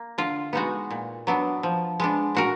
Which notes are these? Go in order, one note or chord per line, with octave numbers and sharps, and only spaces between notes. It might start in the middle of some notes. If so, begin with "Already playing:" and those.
Already playing: A#3
D3 F4
G#3 B3 D#4 F#4
A#2
F#3 B3 D4
F3
G#3 B3 D4
A#2 F#4 A#4